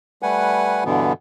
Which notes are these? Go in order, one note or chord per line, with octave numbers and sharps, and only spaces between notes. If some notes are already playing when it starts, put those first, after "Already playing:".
G3 A3 B4 F#5 G#5
G2 B2 D3 E3 B3